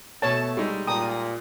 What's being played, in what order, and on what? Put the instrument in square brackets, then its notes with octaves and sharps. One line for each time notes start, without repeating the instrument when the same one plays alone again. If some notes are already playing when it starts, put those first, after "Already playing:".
[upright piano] B2 [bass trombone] A3 [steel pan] C#5 A5
[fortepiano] G3 G#3 D#4 [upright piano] C#6 E6
[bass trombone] A#2 [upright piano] G5 A5 A#5 [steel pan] D#6